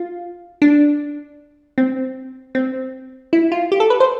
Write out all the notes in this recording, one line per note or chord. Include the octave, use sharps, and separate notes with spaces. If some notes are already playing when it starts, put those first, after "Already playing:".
Already playing: F4
D4
C4
C4
E4
F4
G4
A4
B4
C5